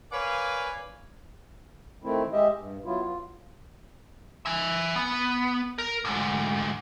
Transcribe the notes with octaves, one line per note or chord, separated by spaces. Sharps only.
A#4 B4 C#5 D5 F5 G#5
D#3 A3 C4 E4
G#3 G4 D#5 E5
G2
F#3 B3 E4 F4
F4
E5 G#5
B3
A#4
D2 G#2